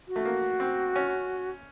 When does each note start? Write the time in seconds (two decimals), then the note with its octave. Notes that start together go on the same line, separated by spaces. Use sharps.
0.08 F#4
0.16 A3
0.25 A#3
0.60 C4
0.96 C#4